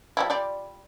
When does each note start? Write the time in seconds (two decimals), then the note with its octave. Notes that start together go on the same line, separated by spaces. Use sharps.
0.17 F3 G3 E4
0.30 G3 F4 D5